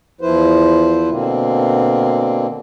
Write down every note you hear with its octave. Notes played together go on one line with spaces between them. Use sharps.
E2 F3 E4 B4 C5
B2 D3 A#3 C4